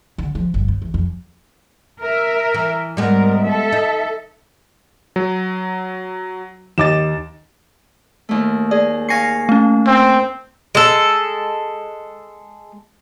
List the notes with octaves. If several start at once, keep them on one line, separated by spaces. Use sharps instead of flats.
D3
F3
G1
D#2
E3
F2
A#4 E5
E3
G#2 G3 G#3 B3 A#4
A4 E5
D#4
F#3
D#2 D#5 D6 A6 E7
D#2 A3
G#4 D5
F5 G#5 C#6 A#6 C7
A3 C#4
C4
G#3 A4